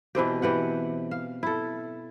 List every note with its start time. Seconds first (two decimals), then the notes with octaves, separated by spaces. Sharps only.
0.15 B2 E3 C4 G4
0.42 E3 G4 F#5
1.11 F5
1.43 E4 A4